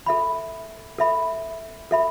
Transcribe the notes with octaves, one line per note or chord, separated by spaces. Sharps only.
A4 E5 B5
A4 E5 B5
A4 E5 B5